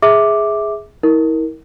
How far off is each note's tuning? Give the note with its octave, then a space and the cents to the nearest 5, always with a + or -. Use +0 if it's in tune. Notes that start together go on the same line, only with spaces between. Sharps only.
G#4 +0 E5 -15 D6 +0
E4 -40 A#4 +0